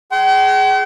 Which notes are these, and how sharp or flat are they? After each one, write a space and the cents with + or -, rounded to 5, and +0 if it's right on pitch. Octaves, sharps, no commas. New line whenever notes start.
G#4 +5 G5 -45 C6 -5